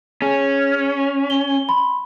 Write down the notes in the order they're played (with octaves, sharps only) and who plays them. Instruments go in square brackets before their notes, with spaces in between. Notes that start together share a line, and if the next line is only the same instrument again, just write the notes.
[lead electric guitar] C#4 [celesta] G#4
[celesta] G7
B5 C6